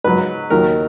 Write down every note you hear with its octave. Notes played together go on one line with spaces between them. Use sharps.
G#2 F#3 B4
D#2 D#3 F#3 A#4